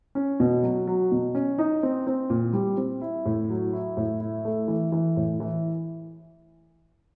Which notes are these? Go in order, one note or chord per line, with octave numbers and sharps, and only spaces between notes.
C#4
B2
F#3
F#3
B2
C#4
D#4
C4
C4
A#2
G3
C4
E4
A2
F#3
E4
A2
E4
A3
E3
E3
A2
E3